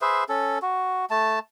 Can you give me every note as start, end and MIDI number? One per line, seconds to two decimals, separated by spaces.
0.01 0.24 68
0.01 0.24 71
0.01 0.24 72
0.01 0.24 76
0.29 0.59 61
0.29 0.59 69
0.62 1.05 66
1.11 1.39 57
1.11 1.39 81